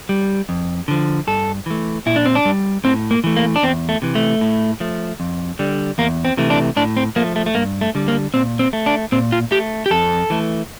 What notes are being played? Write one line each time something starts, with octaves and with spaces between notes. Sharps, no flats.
G3
F2
D3 F3
G2 A4
E3 A3
A#2 E4
D4
C4
D4
G3
A2 C4
A#3
E3 A3
A#3
D4
E2 C4
A3
C3 E3
A3
A2
F3 A3
F2
D3 G3
E2 A#3
C4
C3 E3 A3
D4
A2 D4
C4
F3 A3 A#3
A3
A3
G2 A#3
A3
D3 G3
A#3
A#2 C4
C4
A3
D4
A#2 C4
F4
A3 G4
G4
F2 A4
E3 A3